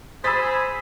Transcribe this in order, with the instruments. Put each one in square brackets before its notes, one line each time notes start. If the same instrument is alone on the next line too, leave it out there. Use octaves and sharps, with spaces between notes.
[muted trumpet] G#4 [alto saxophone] C5 [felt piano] B5 D#6 A6 [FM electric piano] E6 B6